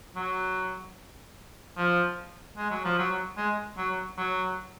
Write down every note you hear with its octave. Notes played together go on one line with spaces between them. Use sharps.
F#3
F3
G#3
F#3
F3
F#3
G#3
F#3
F#3